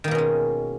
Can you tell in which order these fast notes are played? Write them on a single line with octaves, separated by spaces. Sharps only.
D#3 A#3 B2 C#4 G#3